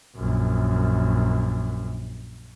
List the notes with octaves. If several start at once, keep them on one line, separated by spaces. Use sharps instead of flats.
A#1 F#2